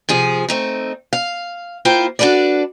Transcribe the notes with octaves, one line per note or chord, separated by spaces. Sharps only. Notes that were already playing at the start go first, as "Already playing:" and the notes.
C3 F3 G#4
A3 C4 D#4
F5
A#3 E4 F4 C5 G5
D4 F#4 A4 B4 D5